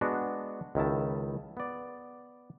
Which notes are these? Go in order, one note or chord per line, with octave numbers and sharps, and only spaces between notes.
G#3 B3 D4 F#4
C#2 D#3 E4 A5
B3 D5